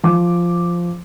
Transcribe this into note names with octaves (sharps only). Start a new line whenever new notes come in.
F3 D6